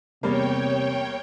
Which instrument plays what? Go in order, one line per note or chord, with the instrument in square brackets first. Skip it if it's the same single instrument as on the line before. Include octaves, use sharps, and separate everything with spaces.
[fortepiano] E2 G3 A#3 [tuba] C3 [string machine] C#5 G5